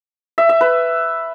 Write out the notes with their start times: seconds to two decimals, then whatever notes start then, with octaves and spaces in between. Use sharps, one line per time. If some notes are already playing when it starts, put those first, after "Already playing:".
0.38 E5
0.49 E5
0.61 B4